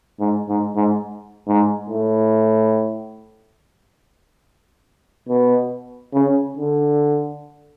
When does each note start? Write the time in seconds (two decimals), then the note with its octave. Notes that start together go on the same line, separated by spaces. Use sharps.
0.20 G#2
0.49 G#2
0.76 G#2
1.48 G#2
1.89 A2
5.29 B2
6.14 C#3
6.57 D3